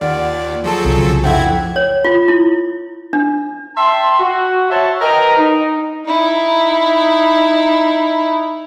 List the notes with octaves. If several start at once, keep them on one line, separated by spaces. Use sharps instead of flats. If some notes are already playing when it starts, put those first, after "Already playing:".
D#2 F4 D5 F#5
F3 F#3 G#4 A4
C2 C#3
F1 C4 E4 F4 F#5 G5 G#6
C#5
F4
E4
D4
E5 G5 A5 C6
F#4
C5 C#5 E5 F#5 A5
A#4 B4 D#5 G5 A#5
D#4
D#4 E4